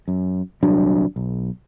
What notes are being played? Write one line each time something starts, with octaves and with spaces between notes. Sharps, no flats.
F#2
D#1 C2 F#3 D4
B1